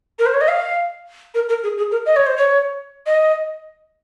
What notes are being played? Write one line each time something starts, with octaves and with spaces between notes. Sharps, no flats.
A#4
C5
C#5
D#5
F5
A#4
A#4
G#4
G#4
A#4
D#5
C#5
C5
C#5
D#5